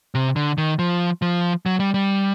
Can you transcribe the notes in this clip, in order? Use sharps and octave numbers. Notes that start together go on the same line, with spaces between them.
C3
D3
D#3
F3
F3
F#3
G3
G3